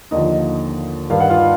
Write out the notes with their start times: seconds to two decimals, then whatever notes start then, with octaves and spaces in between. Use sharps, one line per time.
0.11 D#2 D3 F3 D#4 D#5
1.10 G2 D#3 F5
1.20 F#5
1.30 F4 F5